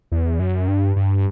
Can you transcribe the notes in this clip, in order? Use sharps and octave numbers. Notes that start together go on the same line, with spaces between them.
E2
F#2
G2
G2